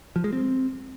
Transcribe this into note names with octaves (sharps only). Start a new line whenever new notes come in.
F3
G#3
C4